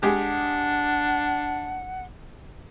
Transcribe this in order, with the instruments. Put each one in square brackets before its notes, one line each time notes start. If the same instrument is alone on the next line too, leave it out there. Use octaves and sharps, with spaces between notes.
[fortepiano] G#3 G4 [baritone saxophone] D4 [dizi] F#5